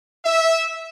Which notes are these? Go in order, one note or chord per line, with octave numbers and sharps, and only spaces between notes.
E5